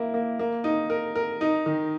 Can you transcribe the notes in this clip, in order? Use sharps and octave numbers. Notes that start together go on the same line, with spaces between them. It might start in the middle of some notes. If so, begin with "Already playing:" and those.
Already playing: A#3 E4
A#3
A#3
D#4
A#4
A#4
D#4
D#3